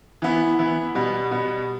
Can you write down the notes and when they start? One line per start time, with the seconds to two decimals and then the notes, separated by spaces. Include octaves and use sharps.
0.22 E3 B3 E4
0.59 E3 B3 E4
0.95 B2 G3 B3
1.31 B2 G3 B3